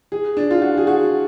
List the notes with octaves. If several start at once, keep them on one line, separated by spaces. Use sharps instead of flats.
G#4
D4
F4
F#4
G#4
F#4